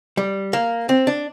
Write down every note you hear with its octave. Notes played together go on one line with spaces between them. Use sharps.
G3
A#3
C4
D4